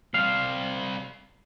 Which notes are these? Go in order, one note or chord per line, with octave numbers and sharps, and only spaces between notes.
G3 C4 F5